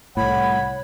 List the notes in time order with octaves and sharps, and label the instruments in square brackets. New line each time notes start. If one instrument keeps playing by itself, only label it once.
[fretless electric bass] C2 A2 [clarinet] C#5 [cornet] F#5 [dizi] B5